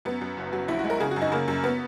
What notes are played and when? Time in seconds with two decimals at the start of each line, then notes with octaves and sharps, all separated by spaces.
0.05 F#2 B3
0.21 F#2
0.37 F#1
0.53 F#3
0.68 A#1 E4
0.79 F#4
0.84 G#3
0.90 A#4
1.00 C#3 G#4
1.11 F#4
1.16 F#2
1.22 D#4
1.32 C#3 A#3
1.48 F#2
1.64 B3